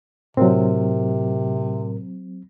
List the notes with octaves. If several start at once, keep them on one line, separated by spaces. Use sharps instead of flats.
A2 C3 F#3 C4 A#4